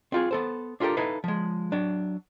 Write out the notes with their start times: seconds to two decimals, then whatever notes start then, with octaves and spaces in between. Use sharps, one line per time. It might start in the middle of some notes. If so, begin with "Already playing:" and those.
0.12 C4 F4 G#4
0.31 B3 A4 C5
0.80 D4 F4 G4 A4 A#4
0.97 D#4 E4 A4 B4 F5
1.24 F3 G#3
1.72 F#3 D4